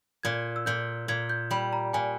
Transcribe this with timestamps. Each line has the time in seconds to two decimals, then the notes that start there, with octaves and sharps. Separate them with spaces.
0.23 A#2 G#6
0.56 E6
0.66 A#2 G6
1.08 A#2 G#6
1.30 G6
1.51 G3 B5
1.73 A#5
1.93 A#2 G#5